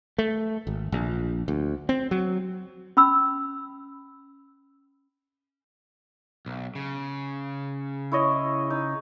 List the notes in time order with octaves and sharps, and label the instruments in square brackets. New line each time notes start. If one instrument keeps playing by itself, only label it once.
[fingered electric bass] A3
G#1
A#1
D2
C4
F#3
[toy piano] C#4 B5 E6
[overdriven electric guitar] B1
C#3
[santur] E4 C#5 D#5
D#4